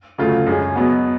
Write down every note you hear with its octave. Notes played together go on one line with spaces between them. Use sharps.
D2 C#3 F#3 A3 F4
F#2 C#3 G#3 C#4 G#4
B2 F#3 B3